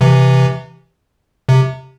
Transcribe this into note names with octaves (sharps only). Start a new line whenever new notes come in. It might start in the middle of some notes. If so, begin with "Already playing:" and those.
C3 E3
C3